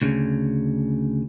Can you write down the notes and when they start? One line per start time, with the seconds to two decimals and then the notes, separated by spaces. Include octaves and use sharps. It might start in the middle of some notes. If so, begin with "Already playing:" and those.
0.02 D2 C#3